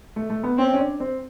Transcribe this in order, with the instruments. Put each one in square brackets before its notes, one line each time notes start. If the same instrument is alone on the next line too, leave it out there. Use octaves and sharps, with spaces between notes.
[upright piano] A3
A3
B3
[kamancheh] C4 [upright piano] C#4
[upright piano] C#4
D4
C4